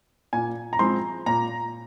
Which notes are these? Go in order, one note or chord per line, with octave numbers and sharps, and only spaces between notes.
A#2 G#5
A#5
F3 G#3 C4 C6
A#2 A#5